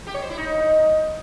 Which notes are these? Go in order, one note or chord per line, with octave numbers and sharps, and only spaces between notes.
G4
C#5
C5
E4
D#4